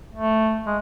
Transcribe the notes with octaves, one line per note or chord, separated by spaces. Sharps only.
A3
G#3